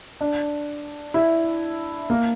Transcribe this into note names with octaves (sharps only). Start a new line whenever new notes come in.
D4
E4
A#3